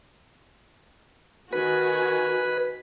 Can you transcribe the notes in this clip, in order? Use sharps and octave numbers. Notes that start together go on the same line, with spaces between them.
D#3 F#4 B4 G#5